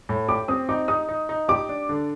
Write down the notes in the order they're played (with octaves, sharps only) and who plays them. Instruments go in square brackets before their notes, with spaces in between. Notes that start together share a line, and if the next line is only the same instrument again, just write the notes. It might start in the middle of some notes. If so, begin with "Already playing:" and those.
[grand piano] A2
[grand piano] G4 [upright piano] D6
[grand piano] C4 [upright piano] D#6
[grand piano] D#4 [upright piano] D6
[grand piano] D#4 [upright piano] D#6
[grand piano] D#4
D#4
[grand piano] G4 [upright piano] D6
[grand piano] D4
D3